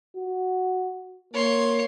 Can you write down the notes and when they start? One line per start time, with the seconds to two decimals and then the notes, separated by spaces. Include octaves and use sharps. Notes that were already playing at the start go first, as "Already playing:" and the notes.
0.16 F#4
1.34 A#3 C#5 C6